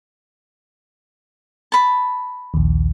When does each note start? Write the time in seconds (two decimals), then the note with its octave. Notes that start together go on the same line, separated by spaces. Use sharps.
1.72 A5 B5
2.54 A#1 D#2